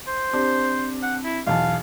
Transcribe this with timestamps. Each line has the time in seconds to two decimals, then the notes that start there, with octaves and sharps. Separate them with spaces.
0.08 C5
0.33 C4 D4 G4
1.03 F#5
1.25 E4
1.47 B1 E2 F5 A5